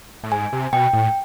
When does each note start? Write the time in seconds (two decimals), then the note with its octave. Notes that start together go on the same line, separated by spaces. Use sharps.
0.24 A2
0.32 G#2 G#5
0.53 C3
0.73 B2 G5
0.93 A2